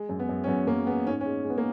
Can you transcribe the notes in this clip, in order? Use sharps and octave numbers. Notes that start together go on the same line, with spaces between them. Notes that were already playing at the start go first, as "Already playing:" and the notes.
Already playing: G#3
F#2
B3
F#2
C#4
F#2 B3
F#2 A#3
G#3 B3
G#2 C#4
C#4
G#3
G#3
B3
A#3